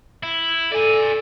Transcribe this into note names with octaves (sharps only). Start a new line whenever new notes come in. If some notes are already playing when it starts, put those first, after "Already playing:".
E4
A4 D5 G#5